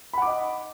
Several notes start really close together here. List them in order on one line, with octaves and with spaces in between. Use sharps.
B5 F#5 D6 D#5